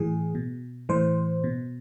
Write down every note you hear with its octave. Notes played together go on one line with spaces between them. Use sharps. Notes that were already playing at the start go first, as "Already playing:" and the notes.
Already playing: A2 E3 G#4
B2
A2 E3 C5
B2